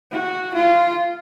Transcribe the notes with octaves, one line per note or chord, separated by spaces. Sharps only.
F#4
F4